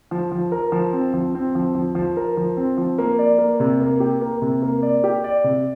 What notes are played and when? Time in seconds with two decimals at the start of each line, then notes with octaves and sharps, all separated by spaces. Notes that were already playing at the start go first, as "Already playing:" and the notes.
0.11 F3
0.32 F3
0.52 A#4
0.72 F3
0.93 C4
1.14 F3
1.35 C4
1.55 F3
1.75 F3
1.95 F3
2.17 A#4
2.37 F3
2.57 C4
2.77 F3
2.98 A#3
3.19 D5
3.39 A#3
3.60 C3
3.81 A#3
4.00 G4
4.21 A#3
4.42 C3
4.63 A#3
4.82 D5
5.04 G4
5.24 D5
5.44 C3